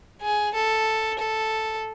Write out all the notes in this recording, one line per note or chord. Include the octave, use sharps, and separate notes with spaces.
G#4
A4
A4